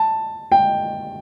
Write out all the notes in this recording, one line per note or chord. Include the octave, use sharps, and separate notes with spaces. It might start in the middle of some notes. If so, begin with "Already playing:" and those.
Already playing: A5
G5